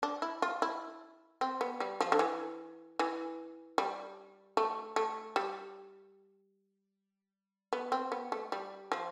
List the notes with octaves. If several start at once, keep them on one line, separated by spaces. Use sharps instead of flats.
D4
E4
F4
E4
C4
B3
G3
F3
D3
E3
E3
G3
A3
A3
G3
B3
C4
B3
A3
G3
F3